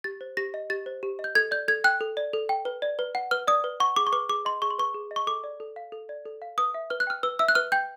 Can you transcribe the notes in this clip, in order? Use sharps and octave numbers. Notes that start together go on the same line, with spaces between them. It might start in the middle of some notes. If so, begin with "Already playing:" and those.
G4 A6
C5
G4 A#6
D#5
G4 A6
C5
G4
D#5
G6
A4 G#6
D5 G6
A4 G#6
G5 F#6
A4
D5
A4
G5
B4
D5
B4
F#5
B4 F6
D5 D#6
B4
F#5 C#6
G#4 D6
C#6
B4 D6
G#4 D6
D#5 C6
G#4 C#6
C6
B4 C#6
G#4
D#5
C#6
A4 D6
D5
A4
F5
A4
D5
A4
F5
B4 D#6
E5
B4 F6
F#6
G5 F6
B4 E6
E5 E6
F#6
B4 F6
G5 G6